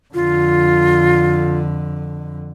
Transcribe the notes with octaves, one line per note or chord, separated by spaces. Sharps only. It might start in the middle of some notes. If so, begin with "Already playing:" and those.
F2 D3 F4